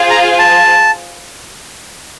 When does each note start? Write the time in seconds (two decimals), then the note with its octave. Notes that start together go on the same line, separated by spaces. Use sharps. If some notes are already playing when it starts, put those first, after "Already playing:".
Already playing: F4 G#4 C5 F5
0.11 A#5
0.39 A5